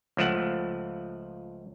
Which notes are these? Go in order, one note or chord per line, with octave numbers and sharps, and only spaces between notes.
C#2 F3 A3 F#5